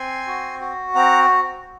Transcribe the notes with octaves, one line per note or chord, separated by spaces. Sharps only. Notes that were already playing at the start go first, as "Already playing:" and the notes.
Already playing: C4 G#5 C6
F#4
F#4
C4 F#5 A#5